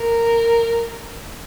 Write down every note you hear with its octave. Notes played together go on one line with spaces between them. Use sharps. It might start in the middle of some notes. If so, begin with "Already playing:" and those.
Already playing: A#4